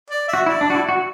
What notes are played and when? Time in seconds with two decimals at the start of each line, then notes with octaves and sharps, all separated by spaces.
0.10 D5
0.28 E5
0.33 F#4
0.46 E4 D5
0.61 D4
0.70 F#4
0.75 E4
0.89 F#4